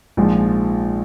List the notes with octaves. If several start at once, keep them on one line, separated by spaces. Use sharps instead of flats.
A#1 G#2 F3 G#3